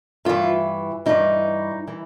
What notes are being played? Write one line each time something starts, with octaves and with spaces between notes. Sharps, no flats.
G2 E3 F4
G2 E3 D#4
E3